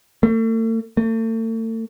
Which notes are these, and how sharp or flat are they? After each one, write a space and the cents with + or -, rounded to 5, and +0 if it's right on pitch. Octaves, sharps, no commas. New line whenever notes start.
A3 +40
A3 +40